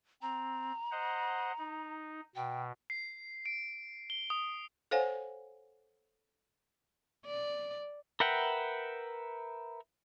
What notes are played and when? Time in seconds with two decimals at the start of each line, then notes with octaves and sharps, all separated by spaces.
0.22 C4 A#5
0.91 C5 D#5 F#5
1.58 D#4
2.35 B2 G5
2.90 C7
3.46 D7
4.10 G7
4.30 D#6
4.91 A4 C5 C#5 F5 F#5 G#5
7.26 D5
8.20 A#4 B4 E5 F#5 G5